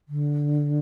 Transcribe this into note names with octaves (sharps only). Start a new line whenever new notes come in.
D3